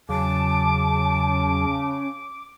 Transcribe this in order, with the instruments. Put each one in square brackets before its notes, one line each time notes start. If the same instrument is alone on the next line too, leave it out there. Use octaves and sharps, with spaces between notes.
[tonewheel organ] E2 F#3 [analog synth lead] C#3 [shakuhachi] A5 [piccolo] D6